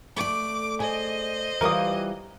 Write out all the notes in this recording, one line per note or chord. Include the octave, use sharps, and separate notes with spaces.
A3 D5 D6
G#4 C5 D#5
E3 G3 F4 A#4 D#6